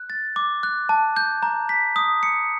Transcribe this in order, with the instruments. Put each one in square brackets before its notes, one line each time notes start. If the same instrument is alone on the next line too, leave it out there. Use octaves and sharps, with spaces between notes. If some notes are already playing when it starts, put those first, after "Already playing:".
Already playing: [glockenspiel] F#6
A6
D6
F#6
A5
G6
A#5
B6
D#6
C#7